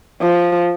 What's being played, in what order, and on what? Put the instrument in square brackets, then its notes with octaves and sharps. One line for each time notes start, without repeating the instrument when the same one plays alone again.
[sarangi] F3